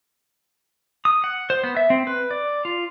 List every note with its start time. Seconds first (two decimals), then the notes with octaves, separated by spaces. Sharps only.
1.05 D#6
1.24 F#5
1.50 C5
1.64 B3
1.77 E5
1.90 C4
2.07 B4
2.31 D5
2.65 F4